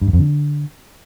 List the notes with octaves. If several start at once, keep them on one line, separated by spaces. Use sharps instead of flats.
G2
F#2
F2
D3